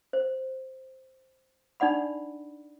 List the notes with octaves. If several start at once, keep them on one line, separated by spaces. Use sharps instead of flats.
C5
D4 D#4 D5 F#5 B5